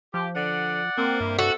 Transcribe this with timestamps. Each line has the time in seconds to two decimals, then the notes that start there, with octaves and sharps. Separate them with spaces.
0.14 F3 G4
0.36 D3 D5 F#5
0.98 A#3 C4
1.20 G2 C3
1.39 F#4 A4